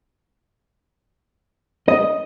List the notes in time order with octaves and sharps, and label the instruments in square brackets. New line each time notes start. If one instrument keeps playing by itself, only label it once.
[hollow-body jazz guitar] D#5